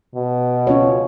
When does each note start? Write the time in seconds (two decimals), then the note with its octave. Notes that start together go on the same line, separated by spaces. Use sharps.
0.15 B2
0.67 C#4 F4 C#5